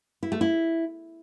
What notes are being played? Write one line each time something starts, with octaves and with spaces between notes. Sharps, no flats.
E4
A3
E4